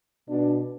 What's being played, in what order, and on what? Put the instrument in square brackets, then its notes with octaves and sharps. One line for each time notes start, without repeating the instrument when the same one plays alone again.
[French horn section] B2 D4